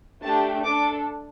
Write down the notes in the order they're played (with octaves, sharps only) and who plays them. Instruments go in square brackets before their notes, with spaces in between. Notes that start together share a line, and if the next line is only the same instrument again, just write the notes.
[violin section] A3 D4 G4 A5
D4 A4 D6